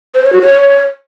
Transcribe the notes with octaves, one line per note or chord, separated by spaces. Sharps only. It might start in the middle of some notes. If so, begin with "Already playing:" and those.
C5
C#5
F#4
C#5